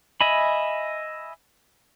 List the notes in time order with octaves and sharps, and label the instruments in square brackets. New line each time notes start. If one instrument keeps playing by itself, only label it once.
[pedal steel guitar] D#5 E5 G#5 B5